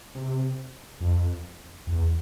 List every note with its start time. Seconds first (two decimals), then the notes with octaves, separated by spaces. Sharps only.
0.15 C3
1.00 F2
1.87 E2